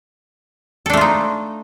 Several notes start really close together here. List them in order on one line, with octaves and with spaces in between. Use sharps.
A4 D4 A3 F4 D#4